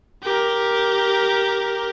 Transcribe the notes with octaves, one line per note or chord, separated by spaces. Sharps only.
G4 A#4